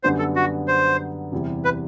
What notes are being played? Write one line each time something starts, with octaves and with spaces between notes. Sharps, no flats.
F#2 D3 G3 B3 D4 C5
A4
F#4
C5
E2 C3 G3 C4 E4
B4